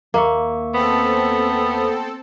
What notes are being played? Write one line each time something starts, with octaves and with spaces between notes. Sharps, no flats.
D#2 A#3 E5 C#6
B3 C4 A4